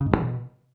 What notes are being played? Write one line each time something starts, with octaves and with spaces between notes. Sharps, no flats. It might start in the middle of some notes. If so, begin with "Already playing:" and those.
C#3
G#2
G2
E3
B2